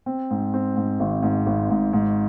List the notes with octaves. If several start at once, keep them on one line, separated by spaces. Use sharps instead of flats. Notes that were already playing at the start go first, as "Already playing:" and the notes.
C4
G#2
C4
G#2
G#1
G#2
G#1
G#2
G#2